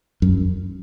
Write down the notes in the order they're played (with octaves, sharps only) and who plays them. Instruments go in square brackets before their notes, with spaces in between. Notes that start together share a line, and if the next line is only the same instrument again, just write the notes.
[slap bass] F#2